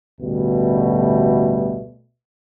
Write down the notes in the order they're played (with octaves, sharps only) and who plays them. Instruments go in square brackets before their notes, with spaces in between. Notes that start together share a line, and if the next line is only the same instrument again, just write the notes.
[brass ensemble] A1 D2 B2 G3 A3